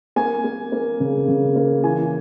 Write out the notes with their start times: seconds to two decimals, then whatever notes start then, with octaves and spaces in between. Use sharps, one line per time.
0.16 A#3 G#5
0.44 A#3
0.72 A#3
1.00 C#3
1.28 C#3
1.56 A#3
1.84 E3 G#5